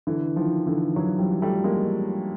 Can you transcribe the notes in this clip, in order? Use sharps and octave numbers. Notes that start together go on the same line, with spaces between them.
D3 E3
D#3 F3
D3 E3
E3 F#3
F3 G3
G3 A3
G#3 A#3